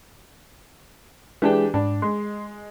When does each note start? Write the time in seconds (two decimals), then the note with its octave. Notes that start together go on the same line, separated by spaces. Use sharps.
1.42 E3 G#3 D4 G4 G#4
1.74 G#2 D4
2.02 G#3 C6